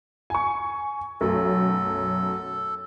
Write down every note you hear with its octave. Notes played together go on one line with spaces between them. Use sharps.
G#5 C#6
B1 F#2 A3 A4